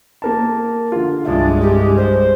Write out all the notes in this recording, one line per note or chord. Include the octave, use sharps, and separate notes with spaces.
A#3 A#4 A5
D3 F4
C2 G2 G#3 D4 E5
G4
C5